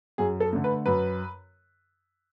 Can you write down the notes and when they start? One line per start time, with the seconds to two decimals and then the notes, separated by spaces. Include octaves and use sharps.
0.18 F#2 G#4
0.40 A4
0.53 D3 A3
0.64 B4
0.86 F#2 B4